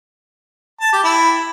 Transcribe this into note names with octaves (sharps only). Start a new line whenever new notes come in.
A5
G4
E4